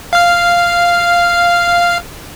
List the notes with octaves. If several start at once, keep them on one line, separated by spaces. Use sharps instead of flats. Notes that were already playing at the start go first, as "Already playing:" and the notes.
F5 F6